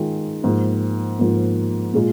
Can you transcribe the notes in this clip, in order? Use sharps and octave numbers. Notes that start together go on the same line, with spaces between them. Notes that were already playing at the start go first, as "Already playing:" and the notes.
Already playing: D#3 G#3 F4
G#2 F3 A#3
G#2 F3 A#3
A#2 G#3 F4